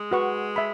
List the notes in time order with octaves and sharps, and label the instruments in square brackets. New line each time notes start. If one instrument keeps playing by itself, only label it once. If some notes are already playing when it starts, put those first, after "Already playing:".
Already playing: [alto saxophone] G#3
[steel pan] F#4 B4 F#5 C#6
E5 B5